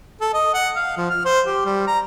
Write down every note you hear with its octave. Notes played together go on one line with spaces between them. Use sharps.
A4
D#5
F#5
F5
F3
F6
C5
G4
G3
A#5